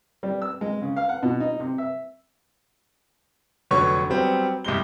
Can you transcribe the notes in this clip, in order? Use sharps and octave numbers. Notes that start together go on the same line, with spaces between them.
G3
E6
G#3
C#3
F5
F#5
B2
D#4
C3
E5
F1 D3 F#3 B4 C#5 C#6
F#3 G3 B3 C4
C2 G3 G#3 G7